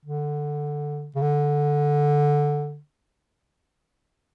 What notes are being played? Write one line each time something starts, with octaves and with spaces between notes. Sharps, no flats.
D3
C#3
D3